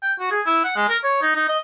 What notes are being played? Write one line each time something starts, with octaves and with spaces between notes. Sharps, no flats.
G5
F#4
G#4
E4
F#5
G#3
A#4
C#5
D#4
D#4
D#5